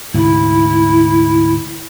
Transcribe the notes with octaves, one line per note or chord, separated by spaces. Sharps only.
D2 G#2 C3 E4